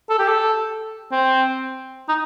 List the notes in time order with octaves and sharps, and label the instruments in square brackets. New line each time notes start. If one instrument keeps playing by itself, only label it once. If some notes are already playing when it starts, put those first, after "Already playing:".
[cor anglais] A4
G4
A4
C4
D#4